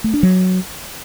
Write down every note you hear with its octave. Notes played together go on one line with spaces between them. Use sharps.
A3
D4
F#3